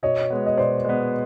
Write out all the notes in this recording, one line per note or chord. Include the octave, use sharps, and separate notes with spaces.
B2 C#5 D#5
G#3 B3
D#5
B2 C5 D5
G#3 B3